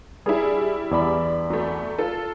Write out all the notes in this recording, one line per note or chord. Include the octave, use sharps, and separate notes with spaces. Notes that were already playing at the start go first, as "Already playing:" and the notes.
G3 D4 E4 G#4
E2 D5 B5
F#3 A3
F4 A4